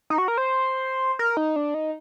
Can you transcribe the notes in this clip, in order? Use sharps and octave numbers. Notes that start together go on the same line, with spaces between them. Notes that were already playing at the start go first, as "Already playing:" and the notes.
D#4
F#4
A#4
C5
A#4
D#4
D4
D#4